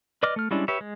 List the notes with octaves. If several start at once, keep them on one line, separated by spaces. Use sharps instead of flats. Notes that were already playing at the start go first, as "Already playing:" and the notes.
B4 D5 D#5 D6 F6
A3 F6
G3 G#3 C#4 D4 E4
G4 B4 C#5 E5
G#3